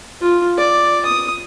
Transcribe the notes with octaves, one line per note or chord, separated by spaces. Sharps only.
F4
D5
D#6